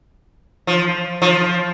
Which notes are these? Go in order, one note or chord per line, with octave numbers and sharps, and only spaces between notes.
F3
F3